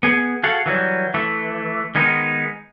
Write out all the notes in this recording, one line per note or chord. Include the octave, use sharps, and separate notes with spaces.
B3 G#4
F#4 G#4 A4 F5 F#5
E3 F#3 G3
E3 A3
D#3 G#3 B3 D#4